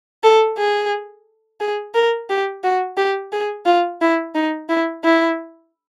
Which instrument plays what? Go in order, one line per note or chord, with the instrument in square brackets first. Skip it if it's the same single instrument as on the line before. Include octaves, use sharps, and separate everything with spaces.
[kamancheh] A4
G#4
G#4
A#4
G4
F#4
G4
G#4
F4
E4
D#4
E4
E4